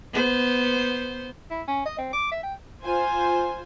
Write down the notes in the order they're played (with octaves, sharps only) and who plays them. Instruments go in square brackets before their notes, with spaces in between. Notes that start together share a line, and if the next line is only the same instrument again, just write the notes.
[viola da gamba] B3 C5
[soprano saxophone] E4
C#4
D#5
C4
D6
E5
G5
[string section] F4 C5 G#5